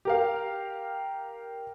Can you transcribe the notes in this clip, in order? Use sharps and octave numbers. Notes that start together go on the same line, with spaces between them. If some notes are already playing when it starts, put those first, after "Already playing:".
G4 A#4 F5